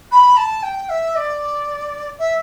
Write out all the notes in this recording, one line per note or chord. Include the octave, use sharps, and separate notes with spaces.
B5
A5
G5
E5
D5
E5